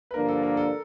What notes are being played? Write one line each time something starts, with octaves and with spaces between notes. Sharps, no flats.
B4
G2 D3 F3 A#3 D4 A#4
A4
A#4
A4